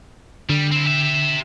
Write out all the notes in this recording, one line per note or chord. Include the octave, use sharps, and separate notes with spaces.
D3 G3
C4 E4
G4 E5